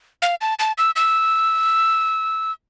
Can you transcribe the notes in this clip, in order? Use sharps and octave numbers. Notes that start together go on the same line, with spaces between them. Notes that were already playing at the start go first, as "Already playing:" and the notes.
F5
A5
A5
E6
E6